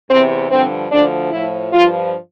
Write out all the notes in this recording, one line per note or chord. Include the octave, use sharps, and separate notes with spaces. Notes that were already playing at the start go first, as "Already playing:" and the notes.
E2 C3 E3 C4
G2 D3 F3 C4
D2 D3 F3 D4
A2 F3 E4
G2 F3 F4